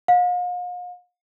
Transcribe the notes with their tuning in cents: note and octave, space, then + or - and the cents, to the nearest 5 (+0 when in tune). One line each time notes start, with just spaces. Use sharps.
F5 +45